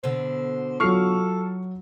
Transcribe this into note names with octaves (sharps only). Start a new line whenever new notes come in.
B2 D3 C5
F#3 F4 A4 C#6 F6 C7